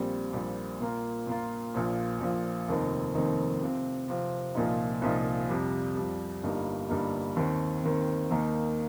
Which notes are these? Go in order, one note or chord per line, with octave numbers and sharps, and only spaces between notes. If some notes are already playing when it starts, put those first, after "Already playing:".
Already playing: A#1 A#2 G3 C4
A#1 A#2 G3 C4
A#2 A#3 F4
A#2 A#3 F4
A#1 A#2 F3
A#1 A#2 F3
F1 D#2 D#3 C4 D#4
F1 D#2 D#3 C4 D#4
C3 F3 C4
C3 F3 C4
C2 A#2 F3 D#4
C2 A#2 F3 D#4
F2 C3 G3
F2 C3 G3
G1 G2 G3 A#3 D#4
G1 G2 G3 A#3 D#4
D#2 D#3 C4
D#2 D#3 C4
D#2 D#3 A#3 D#4